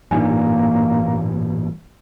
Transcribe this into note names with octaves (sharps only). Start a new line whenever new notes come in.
A1 G2 A#2 A#3 D4 D#4 G#5